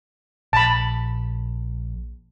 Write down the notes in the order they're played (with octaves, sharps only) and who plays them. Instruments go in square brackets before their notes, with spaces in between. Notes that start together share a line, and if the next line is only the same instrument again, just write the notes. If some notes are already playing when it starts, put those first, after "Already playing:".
[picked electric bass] A#1 [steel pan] A5 B5